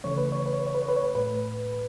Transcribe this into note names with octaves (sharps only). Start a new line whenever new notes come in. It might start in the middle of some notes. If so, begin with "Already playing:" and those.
C#3 E3 A3 C#5
B4
C#5
B4
C#5
B4
C#5
B4
C#5
B4
C#5
B4
A2 A3 B4